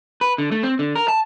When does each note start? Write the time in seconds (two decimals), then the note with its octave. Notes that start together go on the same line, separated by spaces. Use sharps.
0.21 B4
0.38 D3
0.52 A3
0.63 C4
0.79 D3
0.95 A#4
1.08 A5